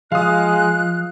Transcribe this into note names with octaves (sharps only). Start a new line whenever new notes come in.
F3 G#3 F5 D#6 F#6